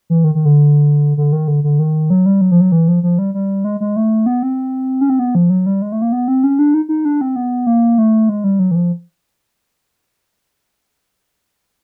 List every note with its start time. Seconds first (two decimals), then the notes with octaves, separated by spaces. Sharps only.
0.10 E3
0.24 D#3
0.35 D#3
0.45 D3
1.17 D3
1.32 D#3
1.48 D3
1.64 D3
1.79 D#3
2.10 F#3
2.26 G3
2.41 F#3
2.51 F3
2.61 F#3
2.72 E3
2.88 F3
3.03 F3
3.19 G3
3.34 G3
3.64 G#3
3.81 G#3
3.96 A3
4.26 B3
4.43 C4
5.01 C#4
5.10 C4
5.19 B3
5.35 F3
5.50 F#3
5.66 G3
5.82 G#3
5.92 A3
6.02 A#3
6.12 B3
6.28 C4
6.44 C#4
6.59 D4
6.74 D#4
6.89 D#4
7.05 D4
7.21 C4
7.36 B3
7.67 A#3
7.98 A3
8.29 G#3
8.44 G3
8.59 F#3
8.71 E3
8.75 F3